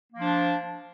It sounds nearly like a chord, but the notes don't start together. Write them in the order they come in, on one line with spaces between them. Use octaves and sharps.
A#3 F3 D4